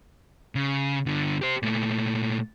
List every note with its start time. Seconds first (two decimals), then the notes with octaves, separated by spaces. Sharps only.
0.55 C#3
1.06 G2 D3
1.42 G4 C5
1.63 A#2 A3